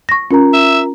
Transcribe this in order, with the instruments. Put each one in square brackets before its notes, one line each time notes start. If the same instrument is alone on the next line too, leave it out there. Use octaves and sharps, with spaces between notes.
[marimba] C#6 A#6
[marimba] C#4 [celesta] F4 A#4 A#5
[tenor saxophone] E5